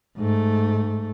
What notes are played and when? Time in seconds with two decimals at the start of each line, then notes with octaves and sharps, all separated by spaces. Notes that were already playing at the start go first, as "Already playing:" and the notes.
0.17 G#2 A3